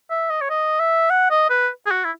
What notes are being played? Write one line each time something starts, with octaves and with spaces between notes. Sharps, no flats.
E5
D#5
C#5
D#5
E5
F#5
D#5
B4
G#4
F#4
E4